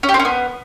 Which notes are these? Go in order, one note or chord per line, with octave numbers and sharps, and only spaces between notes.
C#4
G4
C4
C#4
B3